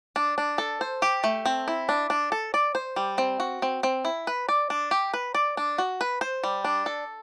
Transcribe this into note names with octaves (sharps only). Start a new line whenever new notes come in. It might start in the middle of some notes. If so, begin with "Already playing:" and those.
D4
D4
A4
C5
G4
A3
C4
E4
D4
D4
A4
D5
C5
G3
C4
F#4
C4
C4
E4
B4
D5
D4
G4
B4
D5
D4
F#4
B4
C5
G3
D4
A4